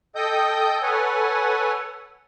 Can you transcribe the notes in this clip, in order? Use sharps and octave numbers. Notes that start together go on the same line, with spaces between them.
A4 D#5 G5 D#6 G6
A4 B4 C#5 F#5 G#5